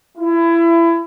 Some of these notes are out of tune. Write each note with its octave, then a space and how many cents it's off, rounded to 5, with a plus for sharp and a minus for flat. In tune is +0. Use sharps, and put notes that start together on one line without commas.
E4 +25